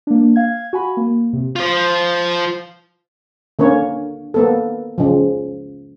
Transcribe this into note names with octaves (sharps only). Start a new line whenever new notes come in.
A#3 D4
F5 G#6
F#4 G#5 B5
A#3
C3
F4 C5
D3 A#3 C#4 C#5
A#3 B3 A4
C#3 F3